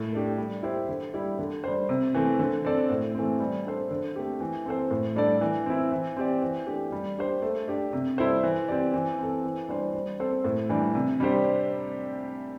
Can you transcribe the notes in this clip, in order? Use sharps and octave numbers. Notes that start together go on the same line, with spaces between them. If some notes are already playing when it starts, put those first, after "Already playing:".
Already playing: A2
A3 D4 G4
G3
E4 G4 C5
D3
G3 E4 G4
D3
G3 D4 C5
C3
E3 A3 C4
D3
C4 A4 D5
A2
E3 A3 C4
G3
D4 A4 C5
D3
A3 C4 G4
E3
C4 A4 C5
A2
G3 D4 A4 D5
E3
C4 E4
E3
C4 G4 D5
E3
A3 D4 G4
G3
D4 G4 C5
A3
D4 G4
C3
G3 E4 A4 C5
E3
C4 G4 D5
E3
C4 A4
E3
G3 D4 C5
G3
C4 A4 C5
A2
E3 G3 D4
C3
G3 D4 G4 C5